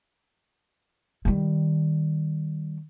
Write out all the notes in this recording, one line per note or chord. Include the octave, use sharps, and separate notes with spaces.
D#3 G3